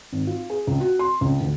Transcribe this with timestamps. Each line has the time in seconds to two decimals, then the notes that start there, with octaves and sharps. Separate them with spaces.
0.13 G#1
0.27 F4
0.50 G#4
0.67 C#2
0.80 F#4
0.99 C6
1.21 C#2
1.41 D2